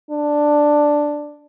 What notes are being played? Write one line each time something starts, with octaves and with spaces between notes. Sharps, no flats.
D4